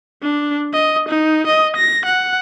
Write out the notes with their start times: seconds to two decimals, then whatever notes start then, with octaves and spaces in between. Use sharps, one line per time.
0.23 D4
0.73 D#5
1.09 D#4
1.47 D#5
1.77 A#6
2.06 F#5